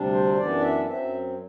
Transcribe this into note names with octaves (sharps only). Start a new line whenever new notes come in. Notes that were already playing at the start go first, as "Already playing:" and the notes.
Already playing: D2 C3 G3 D4
C5
F#2 E3 B3 D4 D5
E5
F#2 F#3 C4 E5